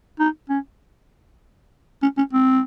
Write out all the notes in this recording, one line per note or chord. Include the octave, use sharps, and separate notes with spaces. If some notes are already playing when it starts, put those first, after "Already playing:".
D#4
C#4
C#4
C#4
C4